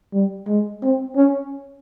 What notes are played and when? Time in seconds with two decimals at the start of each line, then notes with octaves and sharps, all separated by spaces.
0.13 G3
0.48 G#3
0.83 C4
1.16 C#4